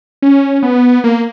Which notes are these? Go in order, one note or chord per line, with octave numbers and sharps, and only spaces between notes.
C#4
B3
A#3